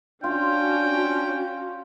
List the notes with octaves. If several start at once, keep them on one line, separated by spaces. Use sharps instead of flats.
C#4 D4 F4 F#4 G5